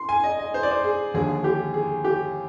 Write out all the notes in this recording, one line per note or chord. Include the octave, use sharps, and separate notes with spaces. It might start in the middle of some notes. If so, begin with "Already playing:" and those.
Already playing: C6
G#5
D#5
D#5
C5
D5
C5
G#4
D#2 D3 F3 G#3 G#4
G4
G#4
G4